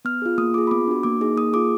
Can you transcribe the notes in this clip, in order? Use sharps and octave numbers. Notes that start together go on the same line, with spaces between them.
B3 F6
F4 G#4
A#3 D#6
F4 G#4 D6
B5
B3 D6
D4 F#4
A#3 D6
D#4 G#4
A#3 D#6
F4 G#4 D6